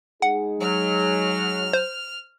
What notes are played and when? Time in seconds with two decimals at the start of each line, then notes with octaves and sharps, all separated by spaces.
0.22 G#3 D#4 G#4 F#5
0.60 F#3 F6
1.73 C5